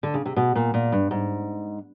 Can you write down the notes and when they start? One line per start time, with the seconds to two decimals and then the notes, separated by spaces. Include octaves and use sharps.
0.03 D3
0.14 C#3
0.25 C3
0.36 B2
0.56 A#2
0.74 A#2
0.92 G2
1.11 G#2